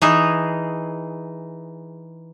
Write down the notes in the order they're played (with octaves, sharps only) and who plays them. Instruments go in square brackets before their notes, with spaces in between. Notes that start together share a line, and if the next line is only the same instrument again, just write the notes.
[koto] E3 D#4 G#4